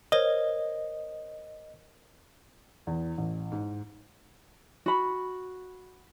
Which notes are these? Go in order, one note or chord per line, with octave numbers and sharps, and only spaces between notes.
A#4 C5 C#5 D#5
E2
A1
G#2
F#4 B5